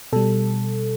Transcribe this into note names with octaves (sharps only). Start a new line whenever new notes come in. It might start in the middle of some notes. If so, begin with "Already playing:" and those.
B2 G3 A4